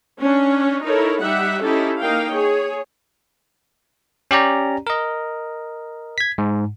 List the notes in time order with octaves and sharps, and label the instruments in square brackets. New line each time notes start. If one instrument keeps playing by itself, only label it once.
[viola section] C#4 D4
D#4 E4 A4 A#4 C#5
G3 D#4 G4 E5 F#5
C#4 D#4 E4 G4 A4
A#3 D#4 A#4 F5 G5
G#4 C#5
[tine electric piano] C#4 G4 D5 A#5
A#4 D#5
G#6 B6
G#2